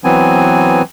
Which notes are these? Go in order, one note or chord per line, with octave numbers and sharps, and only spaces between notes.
E3 F#3 B3 C4 G#5